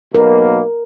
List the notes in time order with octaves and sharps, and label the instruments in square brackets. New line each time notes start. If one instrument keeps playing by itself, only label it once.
[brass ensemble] B1 B2 A#3 [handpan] A#4